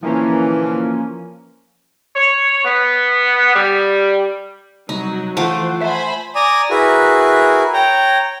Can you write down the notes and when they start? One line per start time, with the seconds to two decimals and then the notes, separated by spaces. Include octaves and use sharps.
0.03 A#2 D3 E3 F3 A#3 C#4
2.15 C#5
2.65 B3
3.55 G3
4.89 C2 F#3 D#4
5.37 E3 F3 A3 F4 C5 F#5 D6
5.81 C5 E5 G#5 A5 B5
6.35 D5 G#5 A#5 D#6
6.70 E4 F#4 G#4 A#4 B4
7.74 C#5 G5 A#5